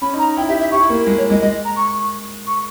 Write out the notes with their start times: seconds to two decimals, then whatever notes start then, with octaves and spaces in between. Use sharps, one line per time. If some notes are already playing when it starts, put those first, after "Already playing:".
0.02 C#4 B5
0.14 D#4
0.19 A#5
0.37 E4 G5
0.48 G4 E5
0.61 E5
0.72 G4 C#6
0.80 E4
0.89 A#3
1.07 G#3
1.18 C#5
1.30 G#3 D#5
1.41 G#3 D#5
1.65 A#5
1.76 C#6
2.47 C#6